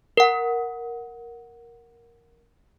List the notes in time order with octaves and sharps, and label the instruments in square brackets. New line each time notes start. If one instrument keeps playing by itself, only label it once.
[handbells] A#4 F#5